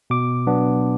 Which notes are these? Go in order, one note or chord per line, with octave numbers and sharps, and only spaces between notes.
B2 D6
F#3 B3 D4